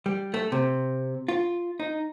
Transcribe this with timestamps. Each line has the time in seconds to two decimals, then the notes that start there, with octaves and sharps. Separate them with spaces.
0.06 G3
0.34 A3
0.52 C3
1.28 F4
1.80 D#4